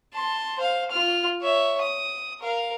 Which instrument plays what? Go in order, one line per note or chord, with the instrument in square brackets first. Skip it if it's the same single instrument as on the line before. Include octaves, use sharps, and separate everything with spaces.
[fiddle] A5 C6
C5 F5
F4 F6
C#5 E5
D#6
A#4 F5